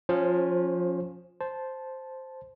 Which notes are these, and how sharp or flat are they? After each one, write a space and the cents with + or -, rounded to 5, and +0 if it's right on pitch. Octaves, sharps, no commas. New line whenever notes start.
F3 +20 C#4 -5 C5 +0
C5 +0 A5 -10